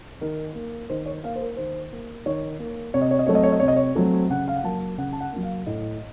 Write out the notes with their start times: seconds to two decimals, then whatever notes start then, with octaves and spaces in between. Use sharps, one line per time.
0.21 D#3 A#4
0.55 A#3
0.90 D#3 C5
1.06 C#5
1.24 A#3 F5
1.36 C5
1.41 A#4
1.57 D#3 C5
1.92 A#3
2.26 D#3 C#5
2.59 A#3
2.94 C3 C#5
3.02 D#5
3.11 C#5
3.19 D#5
3.27 F#3 A3 C4 C#5
3.35 D#5
3.43 C#5
3.52 D#5
3.60 C3 C#5
3.68 D#5
3.76 C#5
3.95 F#3 A3 C4
4.30 C#3 F#5
4.48 F5
4.56 F#5
4.64 F#3 A#3 A5
4.98 C#3 F#5
5.13 A5
5.21 F#5
5.32 F#3 A#3
5.43 F5
5.66 A2 D#5